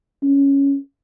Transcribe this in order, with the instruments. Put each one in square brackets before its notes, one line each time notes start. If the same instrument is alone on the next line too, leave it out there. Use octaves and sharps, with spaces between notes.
[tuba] C#4